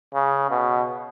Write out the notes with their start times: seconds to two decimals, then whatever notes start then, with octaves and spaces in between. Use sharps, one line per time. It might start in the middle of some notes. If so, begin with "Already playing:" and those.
0.14 C#3
0.51 B2